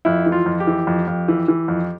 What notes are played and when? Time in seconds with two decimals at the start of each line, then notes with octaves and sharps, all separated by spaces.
0.05 F2 E4
0.26 E3
0.32 F4
0.46 F2
0.60 G4
0.67 E3
0.87 F2
1.07 F2
1.28 E3
1.48 E3
1.68 F2